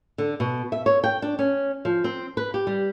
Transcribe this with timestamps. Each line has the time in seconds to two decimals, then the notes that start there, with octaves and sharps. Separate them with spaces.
0.18 D3
0.40 B2
0.72 E5
0.86 C#5
1.04 G5
1.22 D4
1.39 C#4
1.85 F3
2.04 C4
2.37 B4
2.54 G4
2.67 G3